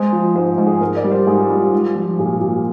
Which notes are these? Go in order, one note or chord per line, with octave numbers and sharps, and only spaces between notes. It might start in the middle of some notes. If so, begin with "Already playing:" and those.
Already playing: G#3 C5
F3
G#2 C5
G#2
G#4
G#2 A#4
D5
G3
C5
G#2 G#4
F4
G3
F4
G#3
F3
A#2 G#4
A#2